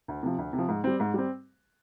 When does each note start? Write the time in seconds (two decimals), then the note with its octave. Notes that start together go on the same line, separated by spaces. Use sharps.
0.08 D2
0.23 C3 F3
0.38 D2
0.53 C3
0.58 F3
0.68 G#2
0.84 G3 C4
1.00 G#2
1.14 G3 C4